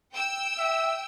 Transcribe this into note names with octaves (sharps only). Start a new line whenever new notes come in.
G5 E6
E5